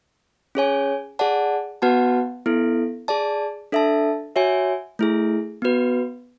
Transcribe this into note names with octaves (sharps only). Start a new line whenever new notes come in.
C#4 G#4 C#5 G#5
G#4 D5 F#5 A5
B3 F#4 B4 F#5 A5
B3 E4 A4
G#4 D5 A5
D4 A4 E5 A5
F#4 C#5 E5 G#5
A3 E4 G#4
B3 F#4 B4